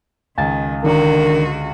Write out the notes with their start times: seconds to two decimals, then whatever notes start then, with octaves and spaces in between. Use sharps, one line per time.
0.38 C#2 D#3 G#5 A6
0.84 D3 D#3 D4 F#4 A#4 A#5